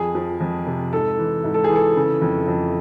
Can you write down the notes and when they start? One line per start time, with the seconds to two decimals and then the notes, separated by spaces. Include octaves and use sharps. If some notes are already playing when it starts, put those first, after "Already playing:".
Already playing: F2 G#4
0.15 F3
0.40 F2
0.66 C3
0.92 G#2 A4
1.18 E3
1.44 G#2
1.54 A4
1.64 G#4
1.70 E3
1.76 A4
1.96 C#3
2.22 F2
2.48 F2